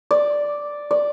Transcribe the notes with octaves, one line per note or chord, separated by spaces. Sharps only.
D5
D5